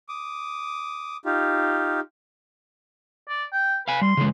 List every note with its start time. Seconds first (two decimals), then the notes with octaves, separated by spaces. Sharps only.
0.09 D6 D#6
1.25 D#4 F4 G4
3.28 D5
3.53 G5
3.88 B4 F5 G#5
4.01 G3 C6
4.17 C#3 E3 G#3